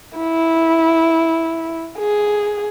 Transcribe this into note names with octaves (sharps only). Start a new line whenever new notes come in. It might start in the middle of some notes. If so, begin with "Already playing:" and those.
E4
G#4